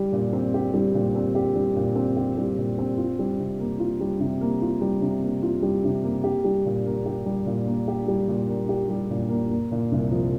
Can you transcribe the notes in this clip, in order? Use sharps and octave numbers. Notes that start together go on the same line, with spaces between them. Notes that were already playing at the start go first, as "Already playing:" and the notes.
Already playing: G3 G4
A#2
C4
G4
G3
A#2
C4
G4
G3
A#2
C4
G4
G3
A#2
C4
F4
G3
C3
A#3
F4
G3
C3
A#3
F4
G3
C3
A#3
F4
G3
C3
A#3
G4
G3
A#2
A#3
G4
G3
A#2
A#3
G4
G3
A#2
A#3
G4
G3
A#2
A#3
A#3
A#2
C2
F3